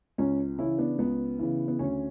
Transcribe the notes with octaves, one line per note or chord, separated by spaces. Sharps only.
C#2 C#4
C#3 E3 C#4 E4
B3 D4
C#2 B3
C#3 E3
B3
D2 C#4